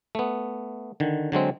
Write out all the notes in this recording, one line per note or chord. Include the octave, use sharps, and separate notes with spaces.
A3 B3
D3 D#3
D3 F#3 G#3 C4